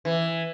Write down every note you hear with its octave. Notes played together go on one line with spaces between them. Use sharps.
E3